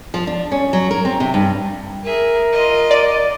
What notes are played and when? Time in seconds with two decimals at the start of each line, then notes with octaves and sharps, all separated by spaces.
0.14 F3
0.27 D4
0.52 C#4
0.73 F#3
0.91 A#4
1.05 C4
1.20 C3
1.34 G2
2.04 G#4 A#4 E5
2.52 F4 D#5
2.91 D5